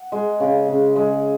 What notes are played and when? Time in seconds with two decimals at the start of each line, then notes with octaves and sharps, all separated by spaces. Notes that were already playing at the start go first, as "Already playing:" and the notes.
Already playing: F#5
0.12 G#3
0.40 C#3
0.68 C#3
0.96 G#3